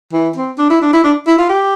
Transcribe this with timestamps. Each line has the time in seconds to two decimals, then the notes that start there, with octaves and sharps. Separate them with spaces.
0.13 E3
0.36 C4
0.58 D4
0.70 E4
0.82 D4
0.93 E4
1.04 D4
1.27 E4
1.38 F4
1.49 G4